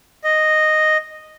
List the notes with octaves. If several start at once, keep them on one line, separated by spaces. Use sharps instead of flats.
D#5